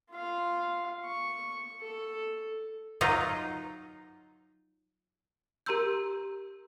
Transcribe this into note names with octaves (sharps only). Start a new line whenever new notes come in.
F4 F5
C#6
A4
F#3 D#4 F4
G4 A#4 A#5 C6 E6 G6